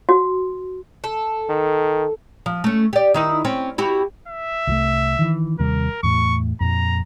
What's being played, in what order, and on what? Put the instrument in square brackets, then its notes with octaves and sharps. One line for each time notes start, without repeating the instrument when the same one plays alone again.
[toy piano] F#4
[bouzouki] A4
[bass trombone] D#3
[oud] F3
A3 C#4
G4 D5
D#3 D#4 E4
C4 C#4
E4 F#4 G4
[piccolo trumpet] E5
[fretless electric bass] C2 E3 A3
D#3 E3
[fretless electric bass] D#2 C3 G3 [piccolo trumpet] A#4
[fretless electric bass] E2 A2 [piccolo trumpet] C#6
[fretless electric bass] F2 A#2 [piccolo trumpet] A#5